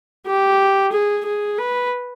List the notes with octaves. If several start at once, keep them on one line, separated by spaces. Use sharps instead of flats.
G4
G#4
G#4
B4